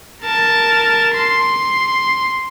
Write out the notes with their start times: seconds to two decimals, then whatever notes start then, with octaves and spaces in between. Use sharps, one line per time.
0.23 A#4 A5
1.15 C6